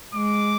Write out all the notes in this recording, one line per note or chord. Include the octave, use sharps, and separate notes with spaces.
G#3 D6